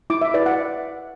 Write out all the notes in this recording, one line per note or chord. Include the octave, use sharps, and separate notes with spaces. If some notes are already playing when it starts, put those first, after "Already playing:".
E4 D6
E5
B4 D5
F#5